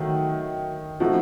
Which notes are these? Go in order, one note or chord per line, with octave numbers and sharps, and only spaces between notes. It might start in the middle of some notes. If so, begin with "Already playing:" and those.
Already playing: D#3 F#3 A3 D#4 A#4
F3 A3 C4 D#4 F#4